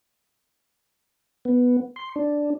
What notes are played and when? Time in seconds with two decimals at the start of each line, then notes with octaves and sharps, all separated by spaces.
1.45 B3
1.96 C6
2.16 D4